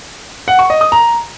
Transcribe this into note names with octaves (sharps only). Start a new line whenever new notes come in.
F#5
C#6
D#5
D#6
A#5